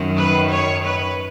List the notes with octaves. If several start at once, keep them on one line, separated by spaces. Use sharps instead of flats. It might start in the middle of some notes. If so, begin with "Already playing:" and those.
Already playing: F#2 D#3
B4
C#5
B4